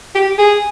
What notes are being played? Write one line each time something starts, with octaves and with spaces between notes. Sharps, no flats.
G4
G#4